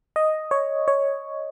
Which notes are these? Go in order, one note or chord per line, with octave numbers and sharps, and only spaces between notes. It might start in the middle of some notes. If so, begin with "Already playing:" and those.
D#5
C#5
C#5